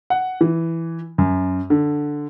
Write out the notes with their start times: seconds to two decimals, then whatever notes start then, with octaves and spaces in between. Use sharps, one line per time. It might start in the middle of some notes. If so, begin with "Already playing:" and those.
0.10 F#5
0.41 E3
1.18 F#2
1.70 D3